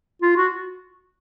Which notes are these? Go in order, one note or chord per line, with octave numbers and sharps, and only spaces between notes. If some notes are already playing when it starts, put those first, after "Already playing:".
F4
F#4